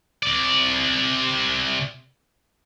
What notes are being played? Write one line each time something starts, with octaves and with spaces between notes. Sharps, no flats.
C3 D5